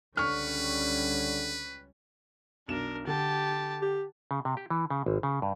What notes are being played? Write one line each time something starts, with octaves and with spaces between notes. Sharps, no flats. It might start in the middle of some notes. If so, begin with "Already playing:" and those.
C#2 D3 G3 C#4 B4 C#6 F6
B1 D4 A#4 E7
D3 G4 A5
G4
C#3
C3
G4
E3
C#3
G#1
C#3
G2